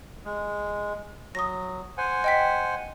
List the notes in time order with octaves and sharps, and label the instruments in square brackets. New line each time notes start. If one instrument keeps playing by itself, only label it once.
[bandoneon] G#3
[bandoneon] F#3 [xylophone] D#6 A#6
[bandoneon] C5 F#5 G#5
[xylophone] D#5 G5 B6